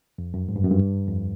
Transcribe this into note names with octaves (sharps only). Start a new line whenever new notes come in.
F2
F#2
G#2
G2
F#2
G2
F2